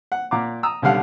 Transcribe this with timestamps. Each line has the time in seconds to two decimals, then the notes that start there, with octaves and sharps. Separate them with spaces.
0.12 F#5
0.31 A#2 F#5 A#5 D6
0.63 A#5 D#6 E6
0.82 B1 D3 G3 F5 F#5